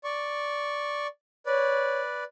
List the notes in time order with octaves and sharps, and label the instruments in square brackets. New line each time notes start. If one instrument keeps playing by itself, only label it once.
[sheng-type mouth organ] D5 C#6
[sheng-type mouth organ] B4 D5 [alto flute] C#5